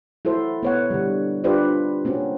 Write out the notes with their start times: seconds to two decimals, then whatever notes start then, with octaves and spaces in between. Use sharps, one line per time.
0.25 E4 F#4 A4 C5
0.63 B3 C#5 F#5
0.90 D3 G3
1.44 D4 F4 G4 B4 C5 D5
2.05 A#3 C4 C#4 F#4